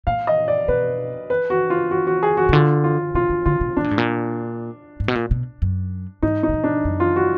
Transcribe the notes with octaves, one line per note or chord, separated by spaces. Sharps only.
A#2 F5
D#5
D5
B2 B4
B4
F#4
F4
F#4
F#4
G#4
F#4
B2
D3 F4
F4
B2 F4
D3
D3 F4
B2
B2 D4
A#2
G#2
A#2
G#2
B2
A#2
B2
F#2
G#2 D#4
D#4
B2
A#2
D4
F#2
F4
F#4